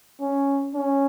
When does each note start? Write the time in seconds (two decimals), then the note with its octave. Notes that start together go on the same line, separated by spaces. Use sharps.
0.21 C#4
0.75 C#4